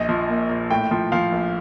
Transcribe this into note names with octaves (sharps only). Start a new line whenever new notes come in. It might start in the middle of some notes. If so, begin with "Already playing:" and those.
Already playing: A#1 D#5
F3
A#2
A#2
A2 G5
F3
F3 F5
A#1